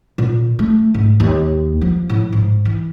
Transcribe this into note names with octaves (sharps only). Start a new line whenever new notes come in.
A#2
A3
G#2
D#2
F3
A2
G#2
E3